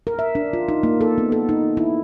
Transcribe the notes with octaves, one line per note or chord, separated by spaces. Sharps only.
A#4
E5
D4
F4
D#4
A#3
A4
B3
A4
D#4
E4